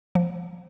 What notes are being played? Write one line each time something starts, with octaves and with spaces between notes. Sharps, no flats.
F3